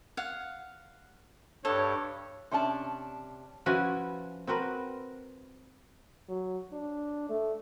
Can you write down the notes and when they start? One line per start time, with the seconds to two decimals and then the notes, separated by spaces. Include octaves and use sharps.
0.17 F5 F#5
1.65 G2 A4 C#5
2.51 C3 C#4 D4 A5
3.66 F3 C#4 E4 F#4 B4 G#5
4.47 C4 F#4 A#4 B4
6.29 F#3
6.72 D4
7.29 A3